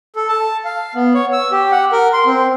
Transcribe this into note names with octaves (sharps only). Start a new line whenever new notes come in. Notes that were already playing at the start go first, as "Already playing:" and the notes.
A4
A5
F5
B3
C#5
E6
G4
F#5
A#4
C6
C4